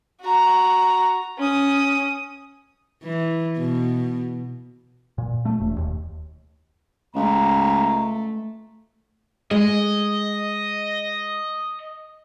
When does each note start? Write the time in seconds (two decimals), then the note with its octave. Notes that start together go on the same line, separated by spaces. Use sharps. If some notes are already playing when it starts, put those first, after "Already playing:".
0.21 F#4 A#5
1.37 C#4 D#6
3.04 E3
3.57 B2
5.18 A#2
5.45 A3
5.60 E1
5.78 D#2
7.16 C#2 A3 A#5
9.51 G#3 D#5